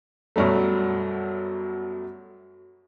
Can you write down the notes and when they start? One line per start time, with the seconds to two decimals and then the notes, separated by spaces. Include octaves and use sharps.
0.36 F#2 B2 F#3 G3 A3